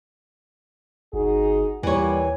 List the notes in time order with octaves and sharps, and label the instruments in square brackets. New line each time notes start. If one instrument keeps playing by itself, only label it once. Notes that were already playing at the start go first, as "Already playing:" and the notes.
[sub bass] G1 [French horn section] D#4 F#4 G#4
[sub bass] D#2 [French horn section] A#2 G3 [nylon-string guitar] E3 C#5